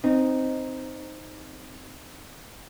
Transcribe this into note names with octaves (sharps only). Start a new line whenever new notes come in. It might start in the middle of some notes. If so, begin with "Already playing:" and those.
C4 D#4